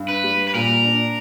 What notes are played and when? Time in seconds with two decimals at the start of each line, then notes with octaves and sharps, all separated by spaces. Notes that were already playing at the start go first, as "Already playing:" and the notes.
Already playing: G2
0.08 B4
0.24 G3
0.47 B4
0.54 A#2 A#4
0.84 D4